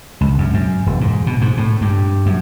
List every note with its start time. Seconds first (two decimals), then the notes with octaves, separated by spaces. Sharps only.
0.21 C#2
0.38 F#2
0.54 F#2
0.86 E1
1.01 G#2
1.27 B2
1.41 G#2
1.57 A2
1.81 G2
2.26 F#2